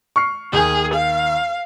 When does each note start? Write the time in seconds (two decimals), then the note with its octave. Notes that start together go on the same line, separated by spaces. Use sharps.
0.16 C#6 F6 C7
0.53 D#2 G#4 G#5 G6
0.94 F5